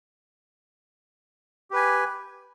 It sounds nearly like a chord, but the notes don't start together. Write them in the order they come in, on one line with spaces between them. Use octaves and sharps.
G4 B4 G#5